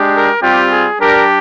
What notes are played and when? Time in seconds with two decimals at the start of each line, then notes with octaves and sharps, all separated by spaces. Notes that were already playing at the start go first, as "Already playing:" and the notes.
Already playing: G#3 D4 G4
0.14 A#4
0.42 G3 C4 F4 G4
0.71 G#4
0.99 G3 D4 G4 A#4